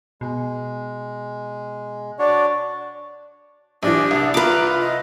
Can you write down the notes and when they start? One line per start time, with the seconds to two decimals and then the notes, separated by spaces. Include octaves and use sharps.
0.21 B2 G#3
2.19 D4 F#4 C#5 D5
3.83 A#1 E3 D4 G4
4.11 C2
4.34 F4 B4 A#5 D6
4.81 D#5